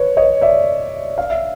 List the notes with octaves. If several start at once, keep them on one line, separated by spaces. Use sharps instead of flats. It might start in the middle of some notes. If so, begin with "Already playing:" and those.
Already playing: B4 C#5
C#5 D#5
D5 E5
F5
E5